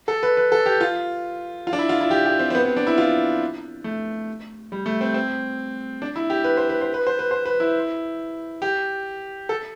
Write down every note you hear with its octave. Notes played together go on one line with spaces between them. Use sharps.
A4
B4
B4
A4
G4
F4
F4
D4
E4
F4
E4
G4
G4
C4
C4
B3
C4
B3
D4
E4
F4
A3
G3
A3
C4
C4
D4
E4
G4
B4
C5
B4
C5
B4
C5
B4
C5
B4
E4
G4
A4